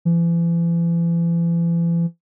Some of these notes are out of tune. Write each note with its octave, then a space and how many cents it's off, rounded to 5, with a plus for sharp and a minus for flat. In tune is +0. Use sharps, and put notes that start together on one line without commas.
E3 +40